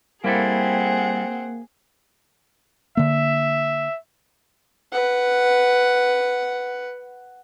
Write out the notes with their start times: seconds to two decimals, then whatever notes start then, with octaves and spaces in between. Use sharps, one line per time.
0.24 G3 A#3 C4 E4 G#4 A4 F#5
2.97 D3 A#3 E5
4.92 B4 F#5